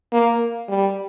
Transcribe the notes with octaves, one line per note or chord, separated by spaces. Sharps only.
A#3
G3